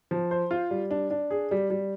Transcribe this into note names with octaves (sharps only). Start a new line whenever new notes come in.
F3
C5
F4
G3
D4
D4
G#4
G3
G3